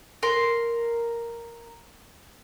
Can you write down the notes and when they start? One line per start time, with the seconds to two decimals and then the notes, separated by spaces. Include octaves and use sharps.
0.23 A#4 C6